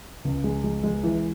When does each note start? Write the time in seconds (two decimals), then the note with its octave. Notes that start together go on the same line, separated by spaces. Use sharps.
0.24 C#2
0.44 G#3
0.63 G#3
0.83 G#3
1.03 E3